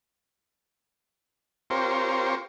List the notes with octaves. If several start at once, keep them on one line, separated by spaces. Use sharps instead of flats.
C4 F4 G4 A#4 C5 C#5